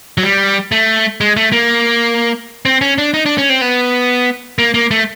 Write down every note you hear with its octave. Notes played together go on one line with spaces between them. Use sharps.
F#3
G3
A3
G#3
A3
A#3
C4
C#4
D4
D#4
D4
C#4
C4
B3
A#3
A#3
A3